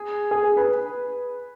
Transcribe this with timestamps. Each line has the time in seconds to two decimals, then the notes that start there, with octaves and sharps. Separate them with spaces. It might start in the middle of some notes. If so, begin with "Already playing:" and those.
Already playing: G#4
0.31 G#4
0.44 G#4
0.57 B4